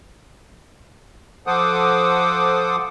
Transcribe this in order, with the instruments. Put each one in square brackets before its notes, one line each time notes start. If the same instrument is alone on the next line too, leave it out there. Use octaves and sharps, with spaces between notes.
[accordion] F3 A4 C5 F#5 D6 D#6